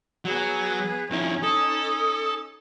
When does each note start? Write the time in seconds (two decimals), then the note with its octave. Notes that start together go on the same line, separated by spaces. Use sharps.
0.25 F#3 B3 G#4
1.11 F2 C#4 D#4 E4
1.43 A4 D#6